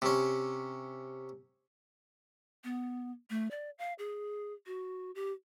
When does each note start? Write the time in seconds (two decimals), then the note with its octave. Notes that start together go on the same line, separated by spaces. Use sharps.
0.02 C3 C#4
2.64 B3
3.30 A3
3.51 D5
3.78 F5
3.99 G#4
4.66 F#4
5.15 G4